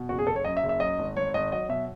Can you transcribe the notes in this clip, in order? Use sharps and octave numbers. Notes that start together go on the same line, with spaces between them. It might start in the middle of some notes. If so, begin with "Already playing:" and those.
Already playing: B2
F#1 F#4
G#4
F#1 A4
C#5
F#2 D#5
E5
F#1
E5
F#2 D#5
G#1
G#1 C#5
G#1 D#5
F#3 D#5
B2 E5